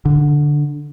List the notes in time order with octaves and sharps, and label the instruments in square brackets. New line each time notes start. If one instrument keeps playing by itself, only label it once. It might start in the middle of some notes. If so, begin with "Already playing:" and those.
[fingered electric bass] D3